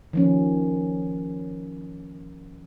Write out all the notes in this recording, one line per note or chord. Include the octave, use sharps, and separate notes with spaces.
D#3 F3 C#4